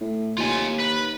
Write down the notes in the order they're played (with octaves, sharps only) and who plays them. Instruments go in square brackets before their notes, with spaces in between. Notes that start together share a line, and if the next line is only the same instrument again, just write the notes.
[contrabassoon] A2
[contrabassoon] D#2 [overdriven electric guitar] F4 G#5
[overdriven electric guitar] B4